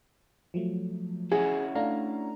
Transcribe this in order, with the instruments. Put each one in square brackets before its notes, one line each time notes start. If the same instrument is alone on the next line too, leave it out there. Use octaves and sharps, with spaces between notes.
[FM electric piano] F3 F#3 A3
[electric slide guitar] C#4 E4 F#4 [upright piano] G#4
[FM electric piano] A3 D4 A#5 [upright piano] F5